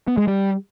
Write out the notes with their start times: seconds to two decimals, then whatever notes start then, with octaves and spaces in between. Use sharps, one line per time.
0.08 B3
0.17 G#3
0.27 G3